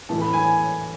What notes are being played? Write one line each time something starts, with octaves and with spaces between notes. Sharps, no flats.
A2 E3 A3 A5
B5
G#5